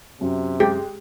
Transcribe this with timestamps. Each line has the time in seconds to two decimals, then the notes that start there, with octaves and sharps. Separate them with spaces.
0.21 F#2 C3
0.60 G#3 G4